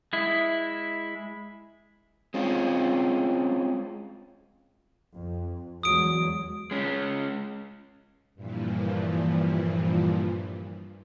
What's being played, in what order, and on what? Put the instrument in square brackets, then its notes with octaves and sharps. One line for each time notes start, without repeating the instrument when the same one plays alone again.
[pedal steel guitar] G#3 E4
[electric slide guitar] G#3 C4 C#4 F4
[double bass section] F2
[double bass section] E2 F#3 G#3 [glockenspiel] D#6 D7
[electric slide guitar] G#3 C#4
[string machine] G2 A#2 E3 F3